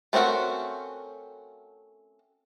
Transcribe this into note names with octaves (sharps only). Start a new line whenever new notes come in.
A3 C4 C#4 F#4 A#4